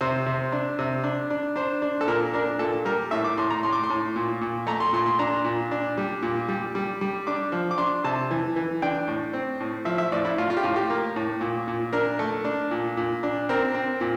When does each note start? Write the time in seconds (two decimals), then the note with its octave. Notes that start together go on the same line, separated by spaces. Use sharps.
0.01 C3 C5
0.26 C3
0.52 D4
0.79 C3
1.04 D4
1.30 D4
1.56 D4 C5
1.82 D4
2.01 A4
2.07 A#2 A#4
2.33 D4 A#4
2.59 A#2 A4
2.85 G3 A#4
3.11 A2 E5
3.24 D6
3.37 A2 C6
3.50 A#5
3.63 A2 C6
3.73 D6
3.83 C6
3.90 A2
4.16 A#2
4.41 A#2
4.67 A3 A#5
4.80 C6
4.93 A#2 C6
5.06 C6
5.19 D4 A#5
5.44 A#2
5.71 D4
5.98 G3
6.22 A#2
6.48 G3
6.75 G3
7.01 G3
7.27 D4 D6
7.52 F3
7.71 D6
7.78 D4 C6
8.04 C3 A5
8.31 E3
8.56 E3
8.82 D4 G5
9.08 A2
9.33 C4
9.60 A2
9.85 F3 E5
9.98 E5
10.12 A2 D5
10.25 E4
10.38 A2 F4
10.50 F4
10.57 G4
10.63 A2 F4
10.76 G4
10.90 A#3
11.16 A2
11.41 A#2
11.68 A#2
11.93 D4 A#4
12.19 A3
12.45 D4
12.71 A#2
12.97 A#2
13.23 D4
13.49 C4 A#4
13.74 C4
14.01 A#2